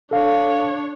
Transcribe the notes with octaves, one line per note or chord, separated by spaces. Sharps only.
D4 A4 C#5 F5